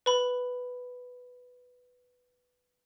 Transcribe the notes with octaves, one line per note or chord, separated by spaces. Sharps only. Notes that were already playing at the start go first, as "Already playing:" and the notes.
B4 B5